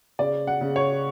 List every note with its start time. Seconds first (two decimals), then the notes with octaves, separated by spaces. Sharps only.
0.19 C#3 D5
0.47 F#5
0.61 C#3
0.76 C#5